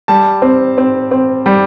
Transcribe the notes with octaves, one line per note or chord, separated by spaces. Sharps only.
G3 A5
C4
C4
C4
G3